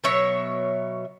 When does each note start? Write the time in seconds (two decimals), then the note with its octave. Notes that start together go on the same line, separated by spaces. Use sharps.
0.04 B2 F#3 C#5 E5